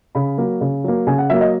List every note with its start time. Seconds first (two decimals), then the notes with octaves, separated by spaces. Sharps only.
0.15 C#3 B5
0.38 F#3 A#3
0.61 C#3
0.84 F#3 A#3
1.07 C#3 G#5
1.18 F#5
1.30 F#3 A#3 E5
1.41 D#5